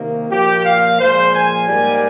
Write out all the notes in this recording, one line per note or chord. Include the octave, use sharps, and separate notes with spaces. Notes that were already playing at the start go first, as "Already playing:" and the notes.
Already playing: C3 D#3 A#3
A#2 F3 A#3 G4
F5
A#2 F3 G#3 C5
G#5
G#2 G3 A#3